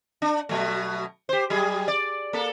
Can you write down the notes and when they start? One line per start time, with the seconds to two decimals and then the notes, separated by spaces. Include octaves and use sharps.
0.22 D4
0.49 B2 F#3 A3
1.29 G4 C5
1.50 F#3 G3 G#4
1.88 D5
2.33 A#3 A4